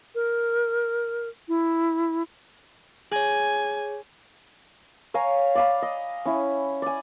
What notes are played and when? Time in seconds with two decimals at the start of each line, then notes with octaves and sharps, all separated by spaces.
0.15 A#4
1.48 E4
3.12 G#4 C#5 G#5
5.14 C#5 F5 G#5 A#5
5.55 D5 F5 B5
5.82 D#5
6.25 C#4 E4
6.82 D5 G#5